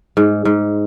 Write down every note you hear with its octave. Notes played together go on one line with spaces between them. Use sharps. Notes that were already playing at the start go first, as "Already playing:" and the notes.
G#2
G#2